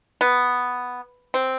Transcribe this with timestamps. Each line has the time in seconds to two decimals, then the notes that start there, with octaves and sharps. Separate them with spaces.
0.21 B3
1.34 C4